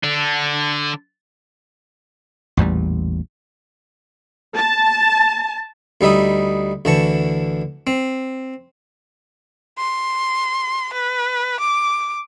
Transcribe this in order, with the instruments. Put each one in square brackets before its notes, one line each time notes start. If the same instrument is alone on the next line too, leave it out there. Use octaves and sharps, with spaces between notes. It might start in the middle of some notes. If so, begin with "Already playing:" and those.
[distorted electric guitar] D3 D4
[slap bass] A1 E2 A#2 G3
[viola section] A5
[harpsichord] D2 G3 D#4 E5 B5 D#6
D2 D3 E3 A5 C#6
C4
[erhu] C6
B4
D6